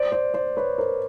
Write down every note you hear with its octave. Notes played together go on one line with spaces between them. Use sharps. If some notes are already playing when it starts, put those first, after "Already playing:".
Already playing: C5 D5
C5 D5
C5 D5
B4 C#5
A#4 C5